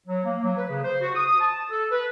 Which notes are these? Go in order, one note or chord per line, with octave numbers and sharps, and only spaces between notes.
F#3
A#3
F#3
B4
C#3
C5
F#4
D#6
A5
A4
B4